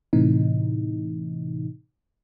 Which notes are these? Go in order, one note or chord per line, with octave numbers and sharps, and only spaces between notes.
A2 C3 E3 D#4